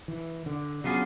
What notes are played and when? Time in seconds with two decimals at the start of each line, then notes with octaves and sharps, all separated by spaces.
0.08 E3
0.46 D3
0.84 C#3 F#3 B3 D4 F4 G#4